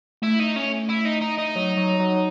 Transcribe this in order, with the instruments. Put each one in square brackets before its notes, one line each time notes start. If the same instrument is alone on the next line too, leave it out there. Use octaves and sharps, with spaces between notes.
[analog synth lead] A3 [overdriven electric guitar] E4
[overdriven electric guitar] D#4
C#4
E4
D#4
D#4
D#4
[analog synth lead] F#3
F#3
F#3